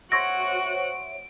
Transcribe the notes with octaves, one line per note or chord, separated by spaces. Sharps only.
F#4 C5 C#5 E5 F#5 A#6 D7